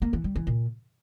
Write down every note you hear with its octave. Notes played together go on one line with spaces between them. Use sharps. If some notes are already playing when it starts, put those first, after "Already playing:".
A#3
E3
G3
E3
A#2